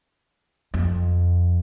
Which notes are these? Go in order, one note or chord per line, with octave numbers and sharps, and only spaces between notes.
F2